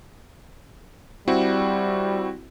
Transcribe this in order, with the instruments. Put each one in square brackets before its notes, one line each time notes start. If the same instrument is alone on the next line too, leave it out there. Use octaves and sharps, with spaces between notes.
[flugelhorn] G3 [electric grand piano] C4 E4 F#4